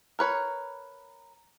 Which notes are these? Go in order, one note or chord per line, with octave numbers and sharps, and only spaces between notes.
A#4 B4 C#5